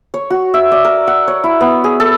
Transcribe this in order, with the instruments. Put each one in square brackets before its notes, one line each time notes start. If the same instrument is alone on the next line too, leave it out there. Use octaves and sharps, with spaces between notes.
[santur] C#5
F#4
E5
D5
A#4
F#5
C#5
E4
B3
G#4
A4